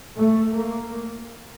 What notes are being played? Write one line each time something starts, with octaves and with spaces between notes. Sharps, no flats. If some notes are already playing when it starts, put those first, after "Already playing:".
A3
A#3